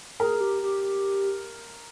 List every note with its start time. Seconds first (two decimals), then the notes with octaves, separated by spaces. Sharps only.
0.19 G#4 A#4
0.41 G4
0.63 G4